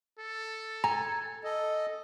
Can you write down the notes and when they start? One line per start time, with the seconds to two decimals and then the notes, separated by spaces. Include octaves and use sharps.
0.19 A4
0.84 G#5 A#5
1.44 A4 D#5